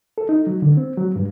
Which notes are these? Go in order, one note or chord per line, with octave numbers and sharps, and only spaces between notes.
A4
D#4
F#3
D3
C4
F#3
G2